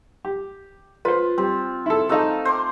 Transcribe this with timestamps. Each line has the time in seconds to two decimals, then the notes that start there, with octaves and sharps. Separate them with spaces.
0.25 G4
1.05 F4 B4 C5
1.38 G3 C4
1.86 E4 A4
2.09 A3 D#4 A4 F5
2.45 C5 C6 D6